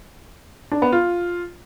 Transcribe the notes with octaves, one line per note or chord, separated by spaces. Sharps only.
D4
B3
F4